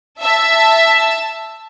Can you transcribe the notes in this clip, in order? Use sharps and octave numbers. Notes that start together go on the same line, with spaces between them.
E5 A5